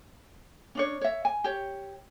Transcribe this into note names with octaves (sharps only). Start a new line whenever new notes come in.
C#4 D4 C#5
C#5 E5
G#5
G4 C#5